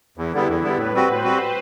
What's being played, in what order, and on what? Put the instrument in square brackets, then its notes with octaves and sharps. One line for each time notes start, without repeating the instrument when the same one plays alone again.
[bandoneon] E2 [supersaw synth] E4
[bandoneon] D3 G3 B3
E2
D3 G3 B3
[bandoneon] A2 [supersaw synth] B4
[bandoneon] G3 C4 F#4
[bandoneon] A2 [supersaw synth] C5
[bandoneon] G3 C4 F#4